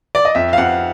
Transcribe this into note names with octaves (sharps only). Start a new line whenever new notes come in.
D5
D#5
F2 E5
F5
F2 F#5